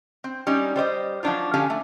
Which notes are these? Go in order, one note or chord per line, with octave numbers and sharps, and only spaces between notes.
C4
G3 C#4 D#4
G3 C5 D5 D#5
F3 F#3 G#3 D4 D#4 F4
D3 C#4 G4 F5 G#5 A5
A3